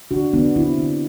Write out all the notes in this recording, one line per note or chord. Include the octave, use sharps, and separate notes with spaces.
D3 D4 F#4
D3 B3 D4
D3 C4 E4
D3